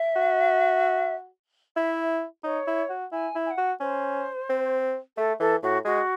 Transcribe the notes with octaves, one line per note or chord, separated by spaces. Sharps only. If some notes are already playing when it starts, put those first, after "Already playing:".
Already playing: E5
F#4
E4 E5
D#4 C#5
E4
F#4
E4 G#5
E4
G#5
F#5
F#4
C#4 C5
C4
A3 A4
E3 A4
A2 F#4
G#3 F#4